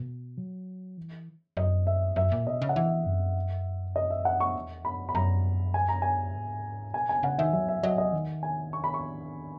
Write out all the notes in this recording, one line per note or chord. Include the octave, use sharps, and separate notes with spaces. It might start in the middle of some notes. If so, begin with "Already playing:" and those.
Already playing: B2
F#3
E3
F#2 D#5
E5
F#2 E5
A#2
B2 D#5
C#3
F#5
E3 E5
F#2
D#5
E5
F#5
C#6
E2
F#2 B5
B5
F#2 A#5
G#5
A#5
G#5
G#2
A#2 G#5
B2 G#5
C#3 F#5
D#3 E5
F#3 E5
E5
F#3 D#5
D#5
D#3
G#5
C#6
B5
C#6